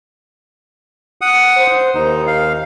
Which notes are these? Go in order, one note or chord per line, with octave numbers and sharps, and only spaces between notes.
F#5 D#6
C5
D#2 D#4
F5